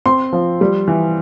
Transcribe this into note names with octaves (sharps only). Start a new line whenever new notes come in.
C4 C6
F3
G3
E3